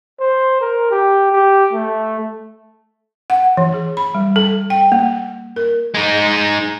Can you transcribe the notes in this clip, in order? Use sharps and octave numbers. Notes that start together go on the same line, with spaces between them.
C5
A#4
G4
G4
A3
F#5
E3
G#4
B5
G3
A4
G5
A#3
A#4
G#3 D#4